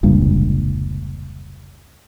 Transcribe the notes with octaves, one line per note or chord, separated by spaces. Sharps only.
F1 C#2 G2 A#2